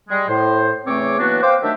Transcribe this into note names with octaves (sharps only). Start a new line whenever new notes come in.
G3 G#3
A2 C5
E2 C#3 A3 C4 C#5 D6
E3 F#3 A#3 B3 D4 F#4
C5 F5 G5 D6
D#3 F#3 A3 D4 G4 E5